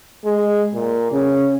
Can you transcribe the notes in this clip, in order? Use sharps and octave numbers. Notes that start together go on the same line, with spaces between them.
G#3
A#2
C#3 C#4